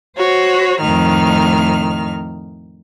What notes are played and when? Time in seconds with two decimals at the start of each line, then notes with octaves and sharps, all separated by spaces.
0.17 F#4 C5 C#5
0.81 F2 A2 D#3 F6